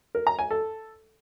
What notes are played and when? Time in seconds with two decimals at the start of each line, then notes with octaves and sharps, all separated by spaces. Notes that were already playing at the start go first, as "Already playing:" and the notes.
0.15 A#4
0.27 A#5
0.39 G#5
0.51 A4